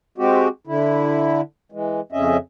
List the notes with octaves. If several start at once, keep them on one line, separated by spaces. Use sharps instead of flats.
G#3 C4 F#4 G4
D3 E4
E3 G#3
F2 C#3 C#4 D#5 E5